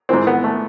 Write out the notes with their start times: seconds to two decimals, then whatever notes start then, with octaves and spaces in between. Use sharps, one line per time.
0.09 G#2 E3 C4
0.27 B3
0.44 A3